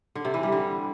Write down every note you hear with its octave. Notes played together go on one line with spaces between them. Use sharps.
D3
C3
E3
G3
D3